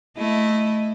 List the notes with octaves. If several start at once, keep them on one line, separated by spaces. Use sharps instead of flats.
A3 E4 D#5